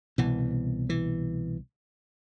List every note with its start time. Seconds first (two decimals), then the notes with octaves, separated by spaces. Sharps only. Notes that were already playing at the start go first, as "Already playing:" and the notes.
0.18 C2 B2 E3
0.89 E3